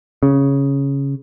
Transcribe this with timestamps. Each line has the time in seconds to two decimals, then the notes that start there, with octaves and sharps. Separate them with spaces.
0.23 C#3